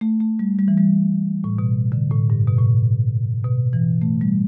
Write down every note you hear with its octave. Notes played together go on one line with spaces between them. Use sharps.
A3
A3
G3
G3
E3
G3
A2
B2
D3
A2
G2
B2
A2
B2
E3
A3
G3